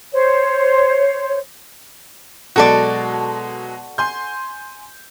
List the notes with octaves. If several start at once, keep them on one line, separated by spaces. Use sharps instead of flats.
C5 C#5
B2 F#3 G#3 F#4 A4 D5
G#5 C6 G6